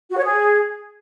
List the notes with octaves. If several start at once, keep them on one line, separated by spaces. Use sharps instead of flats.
F#4
C#5
G#4